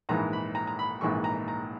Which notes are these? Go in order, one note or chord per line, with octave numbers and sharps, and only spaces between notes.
A#1 G#2 E3 A#5
B5
A#5
A#5
B5
A#1 G#2 E3 C#6
A#5
A#5